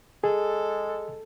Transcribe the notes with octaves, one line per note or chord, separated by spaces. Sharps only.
G#3 G#4 A4